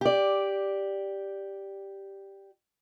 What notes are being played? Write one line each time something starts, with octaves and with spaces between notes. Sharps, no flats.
G4 D5